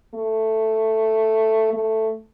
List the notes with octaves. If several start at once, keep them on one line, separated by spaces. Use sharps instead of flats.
A3
A3